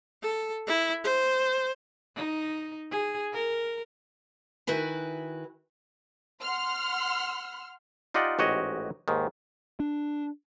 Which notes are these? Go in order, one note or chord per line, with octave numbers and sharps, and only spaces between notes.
A4
E4
C5
D#4
G#4
A#4
D#3 E4 F#4 B4 G#5
F#5 C6 F6
D#4 F4 G4 D5 D#5 F#5
A1 G#2 F#4 G4 C#5 D#5
D#2 G#2 D#3
D4